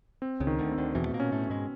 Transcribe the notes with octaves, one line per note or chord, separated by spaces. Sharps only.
C4
C#2 C#3
D#3
D2 D3
C4
D2 D3
E2 B2 E3
A3
A#2 A#3
C#4
A2 A3
C#4
G#2 G#3